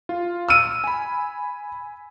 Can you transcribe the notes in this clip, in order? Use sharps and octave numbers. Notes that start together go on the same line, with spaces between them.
F4
E6 F6 D#7
G#5 B5